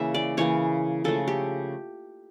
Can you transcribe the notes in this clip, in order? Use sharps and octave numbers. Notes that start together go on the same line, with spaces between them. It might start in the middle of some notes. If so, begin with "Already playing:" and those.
Already playing: C#3 E3 A#3 E5
D5
C#3 E3 A#3 C#5
C#3 F3 A3 A4
G4